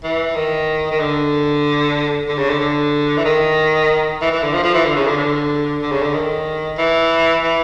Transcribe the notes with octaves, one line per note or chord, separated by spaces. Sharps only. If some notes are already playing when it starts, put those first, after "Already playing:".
E3
D#3
D#3
D3
D3
C#3
D3
D3
E3
D#3
E3
E3
D3
F3
F3
E3
D3
C#3
D3
D3
D3
C#3
D3
D#3
E3
E3